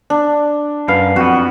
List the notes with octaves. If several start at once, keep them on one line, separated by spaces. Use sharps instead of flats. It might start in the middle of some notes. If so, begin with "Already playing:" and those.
D4
F#2 B4 F5
F2 B3 F#4